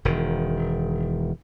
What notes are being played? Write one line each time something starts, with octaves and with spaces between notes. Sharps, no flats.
E1 D#3